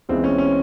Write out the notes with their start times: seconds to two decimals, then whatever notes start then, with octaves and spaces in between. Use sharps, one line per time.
0.09 C#2 C#3 E3 G#3 B3 C4
0.24 C#4
0.38 C#4